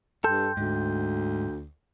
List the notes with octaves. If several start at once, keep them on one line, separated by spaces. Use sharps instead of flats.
G2 A4 G5 C6 G6
D2 G#2